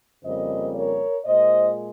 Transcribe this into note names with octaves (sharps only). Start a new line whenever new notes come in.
F2 C#3 G3 A#3 C5 D#5
A#4 C#5
A#2 G#3 C5 D#5